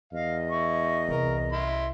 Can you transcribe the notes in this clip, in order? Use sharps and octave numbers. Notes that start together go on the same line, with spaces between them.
E2 D#5 F5
E4 C#6
C2 A#4
E4 C6